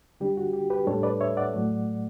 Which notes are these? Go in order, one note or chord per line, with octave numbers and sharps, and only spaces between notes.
D3 G3 D4 G4
F#4
G4
G4 B4
A2 G3 D4 A4 C#5
B4 D5
C#5 E5
D5 F#5
A2 F#3 A3